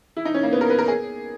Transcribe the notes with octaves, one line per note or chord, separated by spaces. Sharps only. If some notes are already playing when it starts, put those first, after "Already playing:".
E4
D#4
C#4
A#3
B3
A#4
B4
A#4
G#4